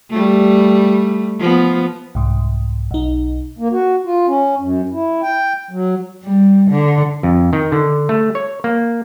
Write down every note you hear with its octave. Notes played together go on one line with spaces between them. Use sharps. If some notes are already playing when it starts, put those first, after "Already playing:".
G3 A3
F3 B3
C2 G#2
B1 D#4
A#3
F#4
F4
C#4
F#2
E4
G5
F#3
G3
D3
F2
D#3
D3
A3
C#5
A#3